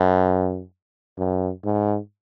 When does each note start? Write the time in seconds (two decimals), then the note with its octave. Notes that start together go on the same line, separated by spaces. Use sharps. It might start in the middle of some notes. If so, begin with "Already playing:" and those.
Already playing: F#2
1.18 F#2
1.65 G#2